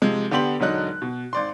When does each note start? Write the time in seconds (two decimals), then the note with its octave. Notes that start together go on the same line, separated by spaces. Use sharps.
0.02 C3 F3 G#3
0.31 D3 B3 G4 C6 F#7
0.60 E1 D3 F#3 D#4 F#6
1.02 B2
1.33 G#1 D5 C6